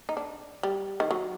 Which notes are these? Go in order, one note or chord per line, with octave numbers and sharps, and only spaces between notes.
D#4
D4
G3
D#3
F#3